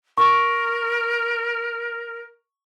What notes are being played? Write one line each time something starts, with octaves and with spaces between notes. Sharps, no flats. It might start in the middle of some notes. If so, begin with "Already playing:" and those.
A#4 C#6